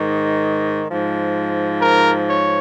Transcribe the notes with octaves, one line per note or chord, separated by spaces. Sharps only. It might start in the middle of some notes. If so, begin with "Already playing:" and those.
Already playing: G#2 D#3
G#2 F3
A#4
C#5